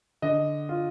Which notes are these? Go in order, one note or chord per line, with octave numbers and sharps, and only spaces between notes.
D3 D#5
F4